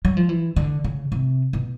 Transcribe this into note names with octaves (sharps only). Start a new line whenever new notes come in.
F#3
F3
E3
D3
C#3
C3
B2